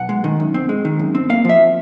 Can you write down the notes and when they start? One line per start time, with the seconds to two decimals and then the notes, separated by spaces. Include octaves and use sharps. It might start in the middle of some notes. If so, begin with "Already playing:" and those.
Already playing: B1 F#5
0.09 G#3
0.24 D#3
0.40 F#2
0.54 C4
0.69 G#3
0.85 D#3
0.99 F#2
1.15 C4
1.30 A#3 F5
1.45 F3 E5